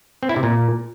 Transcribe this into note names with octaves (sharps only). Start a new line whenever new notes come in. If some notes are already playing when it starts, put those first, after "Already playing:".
C4
E4
C3
A#2